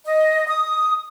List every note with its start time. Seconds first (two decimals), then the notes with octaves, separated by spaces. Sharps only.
0.06 D#5
0.48 D#6